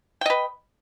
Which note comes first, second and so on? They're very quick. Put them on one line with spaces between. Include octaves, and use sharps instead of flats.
G5 D#5 B4